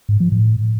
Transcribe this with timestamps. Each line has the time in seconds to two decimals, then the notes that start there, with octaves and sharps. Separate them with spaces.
0.09 G#2
0.20 F3
0.32 A2